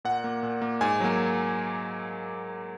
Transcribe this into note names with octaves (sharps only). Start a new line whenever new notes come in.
A#2 F#5
A#3
A#2
A#3
G#2 G#5
F#3 A#3